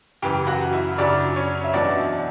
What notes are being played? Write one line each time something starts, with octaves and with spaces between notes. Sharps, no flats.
F#2 C#3 E3 G4 G5
F#4 F#5
E4 E5
F#2 C#3 F#3 D4 D5
C#4 C#5
E5
E2 B2 F#3 D4 D5